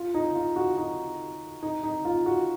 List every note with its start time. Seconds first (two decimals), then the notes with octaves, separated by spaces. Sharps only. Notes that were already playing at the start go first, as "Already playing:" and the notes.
Already playing: F4
0.14 D#4
0.35 F4
0.56 F#4
0.77 D#4
1.63 D#4
1.84 D#4
2.05 F4
2.26 F#4